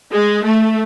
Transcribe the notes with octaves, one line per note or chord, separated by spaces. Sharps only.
G#3
A3